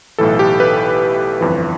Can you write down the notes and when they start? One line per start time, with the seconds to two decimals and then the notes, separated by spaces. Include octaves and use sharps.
0.18 B1 A2 E3 A4
0.39 G4
0.60 B4
1.41 G1 F2 E3